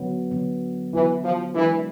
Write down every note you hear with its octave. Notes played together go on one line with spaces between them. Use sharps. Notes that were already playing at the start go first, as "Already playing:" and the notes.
Already playing: D3 F#3 B3
D3 F#3 B3
D3 E3 F#3 B3
F3
E3 G#3 B3 D4 G4 A#4